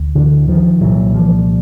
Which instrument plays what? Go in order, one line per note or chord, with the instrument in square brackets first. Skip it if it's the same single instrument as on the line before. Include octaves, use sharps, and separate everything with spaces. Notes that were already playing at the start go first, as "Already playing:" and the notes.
Already playing: [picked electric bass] D2
D3 E3
D#3 F3
C2 A#2 E3 F#3
F3 G3